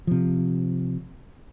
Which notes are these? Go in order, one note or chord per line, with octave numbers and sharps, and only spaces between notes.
C3 F3